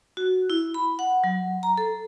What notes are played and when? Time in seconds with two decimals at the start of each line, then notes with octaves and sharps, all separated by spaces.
0.17 F#4
0.50 E4
0.74 B5
0.99 F#5
1.24 F#3
1.63 A#5
1.78 A4